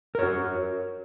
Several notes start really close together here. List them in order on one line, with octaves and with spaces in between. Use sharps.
A#4 C#5 F#4